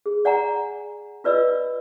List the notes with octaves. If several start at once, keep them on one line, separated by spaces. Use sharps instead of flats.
G#4
D5 F#5 G#5 A#5
F4 B4 D5 D#5 E6